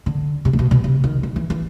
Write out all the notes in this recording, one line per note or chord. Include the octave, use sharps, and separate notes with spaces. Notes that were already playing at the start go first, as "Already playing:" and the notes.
D3
C3
A#2
B2
B2
C3
D#3
E3
E3
E3